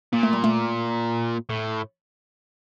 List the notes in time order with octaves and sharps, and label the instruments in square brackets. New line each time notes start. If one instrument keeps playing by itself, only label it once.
[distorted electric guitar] A#2 [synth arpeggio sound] A#3
[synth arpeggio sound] A3
G3
A3
[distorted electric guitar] A2